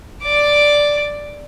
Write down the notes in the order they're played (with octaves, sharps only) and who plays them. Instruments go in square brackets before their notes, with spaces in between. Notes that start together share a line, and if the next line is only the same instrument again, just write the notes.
[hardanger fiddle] D5 D6